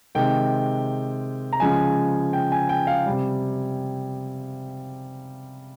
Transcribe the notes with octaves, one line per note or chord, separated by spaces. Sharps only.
C3 D#3 G#3 G5
A#5
C#3 F3 G#3 G#5
G5
G#5
G5
F5
C3 G3